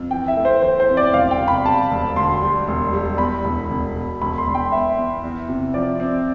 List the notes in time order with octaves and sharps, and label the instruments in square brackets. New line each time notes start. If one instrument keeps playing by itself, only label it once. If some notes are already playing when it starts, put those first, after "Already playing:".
Already playing: [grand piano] F2
[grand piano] E3 [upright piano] G5
[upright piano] E5
[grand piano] A3
[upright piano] C5
[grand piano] E3 [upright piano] C5
[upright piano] C5
[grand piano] F2
[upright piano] D5
[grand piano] E1 [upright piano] F5
[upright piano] G5
[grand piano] C3
[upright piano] B5
[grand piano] G3 [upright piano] A5
[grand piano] E1
[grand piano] D2 [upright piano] C6
[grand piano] G3
E1
G3
[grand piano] E2 [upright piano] B5
[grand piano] E1
E1
B2
[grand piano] E1 [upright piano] B5
[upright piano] C6
[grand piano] E1
[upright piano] G5
[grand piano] B3 [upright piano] E5
[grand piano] E2
E2
C3
[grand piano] F3 [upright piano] D5
[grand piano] C4